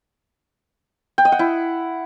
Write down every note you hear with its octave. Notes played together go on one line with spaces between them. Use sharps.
G5
D#5
F#5
E4